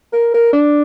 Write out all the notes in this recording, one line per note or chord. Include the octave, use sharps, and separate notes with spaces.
A#4
A#4
D4